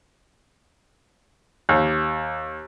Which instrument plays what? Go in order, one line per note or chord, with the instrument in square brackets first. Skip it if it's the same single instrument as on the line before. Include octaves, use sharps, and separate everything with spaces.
[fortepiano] D#2